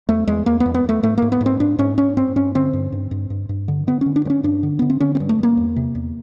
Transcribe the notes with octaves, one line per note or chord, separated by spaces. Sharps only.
E2 A3
E2 G#3
E2 A#3
B3
E2
B3
E2 A3
G#2 A3
G#2 A#3
B3
G#2
C4
G#2 D4
G#2 C#4
G#2 C#4
G2 C4
G2 C#4
D3 C4
G2
G2
G2
G2
G2
D3
D3 B3
D3 C#4
D4
G2
C#4
G2 D4
D3
D3 B3
C4
D3 C#4
C4
G2
A3
G2 A#3
E2
C3
E2